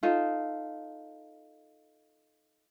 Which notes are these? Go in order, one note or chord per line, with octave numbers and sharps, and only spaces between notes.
D#4 F4 A4